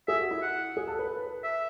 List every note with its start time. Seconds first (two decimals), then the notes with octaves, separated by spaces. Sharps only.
0.08 G#4 E5
0.20 F#4
0.31 E4
0.42 F#5
0.77 G#4
0.88 A4
0.99 B4
1.44 E5